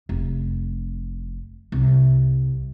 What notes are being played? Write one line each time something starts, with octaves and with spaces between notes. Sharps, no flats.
F1
C2